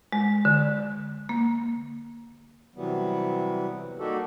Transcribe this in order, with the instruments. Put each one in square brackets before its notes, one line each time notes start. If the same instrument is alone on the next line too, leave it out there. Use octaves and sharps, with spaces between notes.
[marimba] G#3
D3
A#3
[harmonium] C3 E3 F#3 G3 B3
G3 A#3 D#4 F#4 G4 A4